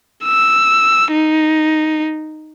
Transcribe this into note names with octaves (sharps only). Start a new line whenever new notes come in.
E6
D#4